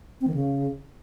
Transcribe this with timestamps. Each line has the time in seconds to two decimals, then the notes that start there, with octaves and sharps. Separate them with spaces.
0.21 C4
0.28 D#3
0.34 C#3